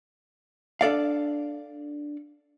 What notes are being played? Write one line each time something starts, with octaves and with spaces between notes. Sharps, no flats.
D4 A4 D5 F5